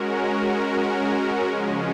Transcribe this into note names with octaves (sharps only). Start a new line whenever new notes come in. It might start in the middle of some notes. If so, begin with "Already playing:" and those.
Already playing: G#3 C#4 F#4 A#4
C#3 F3 G#3 C#4